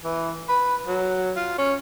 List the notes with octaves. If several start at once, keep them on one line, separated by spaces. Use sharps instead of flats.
E3
B4
F#3
F4
C#4